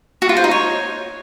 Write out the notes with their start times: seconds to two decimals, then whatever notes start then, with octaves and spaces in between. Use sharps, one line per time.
0.22 F#4
0.29 F4
0.37 C5
0.44 D#4
0.51 C#5